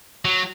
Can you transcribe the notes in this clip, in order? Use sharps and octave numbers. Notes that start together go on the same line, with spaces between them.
F#3